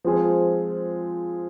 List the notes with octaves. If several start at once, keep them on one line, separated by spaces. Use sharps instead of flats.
F3 G#3 C4 F4 G#4